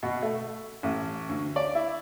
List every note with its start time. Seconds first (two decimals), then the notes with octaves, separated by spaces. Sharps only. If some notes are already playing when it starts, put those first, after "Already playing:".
0.03 B2
0.22 A3
0.83 A1
1.29 D2
1.56 D5
1.75 E4